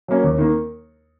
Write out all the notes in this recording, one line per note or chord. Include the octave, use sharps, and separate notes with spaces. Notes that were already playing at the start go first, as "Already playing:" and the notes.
F#3 A#3 C#4
D#2
D#3 A#3